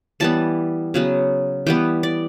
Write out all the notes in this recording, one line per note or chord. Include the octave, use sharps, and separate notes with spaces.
E3 G3 B3 A5
C#3 F#3 B3
E3 G3 B3 G5
D5